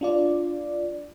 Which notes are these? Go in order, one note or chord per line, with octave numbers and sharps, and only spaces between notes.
D4 F4 D5